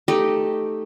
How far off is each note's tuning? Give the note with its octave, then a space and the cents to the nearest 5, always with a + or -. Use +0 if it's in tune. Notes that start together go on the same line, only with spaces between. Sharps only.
A3 +0 D#4 +0 G4 +0